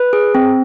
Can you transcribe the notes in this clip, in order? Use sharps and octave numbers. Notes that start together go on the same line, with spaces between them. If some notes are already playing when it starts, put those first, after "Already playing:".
Already playing: B4
G#4
C4